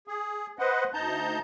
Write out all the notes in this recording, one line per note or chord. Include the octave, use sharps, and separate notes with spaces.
G#4
B4 C5 D#5 F#5
D2 D#4 A5 A#5 G6